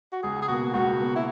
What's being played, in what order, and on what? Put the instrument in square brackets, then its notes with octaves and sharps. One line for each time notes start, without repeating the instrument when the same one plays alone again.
[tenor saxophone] F#4
[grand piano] C#2 [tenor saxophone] G#4
[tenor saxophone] G#4
[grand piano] B2 A#3 [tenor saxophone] F#4
[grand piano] C#2 [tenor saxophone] F#4
[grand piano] B2 A#3
[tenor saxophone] E4